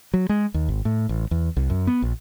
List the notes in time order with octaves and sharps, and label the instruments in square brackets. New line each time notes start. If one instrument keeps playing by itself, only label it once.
[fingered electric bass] F#3
G#3
D#2
G#1
A2
A1
E2
C2
F#2
B3
A#1